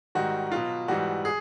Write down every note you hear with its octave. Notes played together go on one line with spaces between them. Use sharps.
G#2 D#3 G3 F#4
B2 F#3 F4
G#2 E3 G3 F#4
G#4